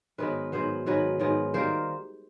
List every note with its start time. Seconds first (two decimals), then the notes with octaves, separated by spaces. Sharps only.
0.18 G#2 D#3 F#3 B3 B4
0.52 G#2 D#3 F#3 B3 C5
0.86 G#2 D#3 F#3 B3 B4
1.19 G#2 D#3 F#3 B3
1.54 D#3 G3 A#3 C5